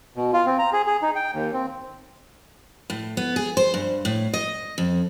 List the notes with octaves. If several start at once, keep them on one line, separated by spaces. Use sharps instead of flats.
B2
F4
C4
A#5
G#4
G#4
D#4
G5
D#2
C4
A2
B3
G#4
C5
G2
A2
D#5
F2